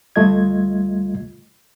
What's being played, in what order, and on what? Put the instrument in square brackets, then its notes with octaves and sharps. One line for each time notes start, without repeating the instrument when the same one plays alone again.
[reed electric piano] D2 G3 A3 F4 D#5 G#6